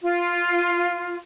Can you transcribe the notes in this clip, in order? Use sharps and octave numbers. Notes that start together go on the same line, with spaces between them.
F4